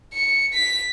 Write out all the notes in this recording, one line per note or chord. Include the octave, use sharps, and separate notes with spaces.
C#7
B6